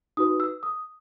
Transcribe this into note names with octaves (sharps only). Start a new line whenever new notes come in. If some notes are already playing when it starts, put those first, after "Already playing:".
D#4 F#4 B4 D#6
E6
D#6